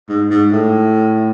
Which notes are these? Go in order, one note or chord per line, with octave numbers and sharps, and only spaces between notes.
G#2
G#2
A2